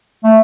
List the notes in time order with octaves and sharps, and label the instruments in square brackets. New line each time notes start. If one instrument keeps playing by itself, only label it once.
[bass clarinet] A3